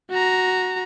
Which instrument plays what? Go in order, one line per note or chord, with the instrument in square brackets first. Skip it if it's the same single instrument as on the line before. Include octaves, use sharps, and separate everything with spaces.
[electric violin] F#4 A#5